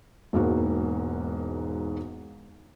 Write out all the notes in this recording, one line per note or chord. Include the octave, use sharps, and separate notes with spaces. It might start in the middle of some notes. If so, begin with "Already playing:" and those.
E1 G#2 A#3 F#4